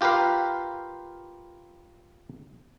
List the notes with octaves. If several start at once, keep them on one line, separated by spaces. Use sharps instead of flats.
F4 G4 A#4 B4 F5